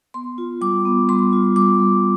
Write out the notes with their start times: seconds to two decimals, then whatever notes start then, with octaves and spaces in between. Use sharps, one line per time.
0.14 B3 C6
0.38 F4
0.61 G3 D6
0.85 B3
1.09 G3 C6
1.33 F4
1.56 G3 D6
1.80 G3